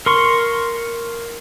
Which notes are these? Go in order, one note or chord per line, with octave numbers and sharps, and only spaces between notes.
A#4 C6 C#6